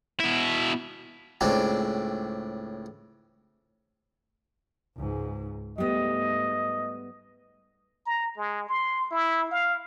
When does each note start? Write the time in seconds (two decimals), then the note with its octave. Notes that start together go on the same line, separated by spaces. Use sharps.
0.20 B2 E4
1.41 C#2 A2 C4 D4
4.97 C#2 G#2
5.78 G#2 G3 A3 B3 D#5
8.06 A#5
8.37 G#3
8.68 C6
9.11 E4
9.51 F5